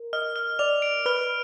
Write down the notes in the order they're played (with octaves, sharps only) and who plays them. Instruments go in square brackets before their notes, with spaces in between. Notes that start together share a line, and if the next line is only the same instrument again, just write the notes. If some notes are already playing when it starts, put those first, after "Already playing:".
Already playing: [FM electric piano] A#4
[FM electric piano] D#5 [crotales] F6
[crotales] F6
[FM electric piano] D5 [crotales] F7
[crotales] D7
[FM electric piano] B4 [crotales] F6